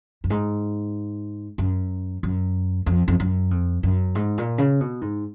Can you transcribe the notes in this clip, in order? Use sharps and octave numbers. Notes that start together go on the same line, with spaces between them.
F#2
G#2
F#2
F#2
F2
F2
F#2
F2
F#2
G#2
A#2
C#3
B2
G#2